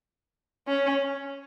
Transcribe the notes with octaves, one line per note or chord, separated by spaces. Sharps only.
C#4